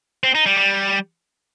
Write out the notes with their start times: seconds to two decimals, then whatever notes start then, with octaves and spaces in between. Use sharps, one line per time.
0.23 C4
0.35 D#4
0.46 G3
0.57 G3